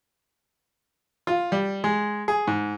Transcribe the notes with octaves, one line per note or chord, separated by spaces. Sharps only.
F4
G3
G#3
G#4
G#2